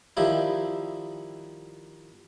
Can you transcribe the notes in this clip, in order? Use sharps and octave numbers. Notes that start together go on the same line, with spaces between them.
D#3 F3 G3 D#4 E4